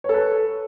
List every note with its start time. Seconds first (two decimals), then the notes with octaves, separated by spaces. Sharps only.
0.04 C#5
0.09 A4
0.14 B4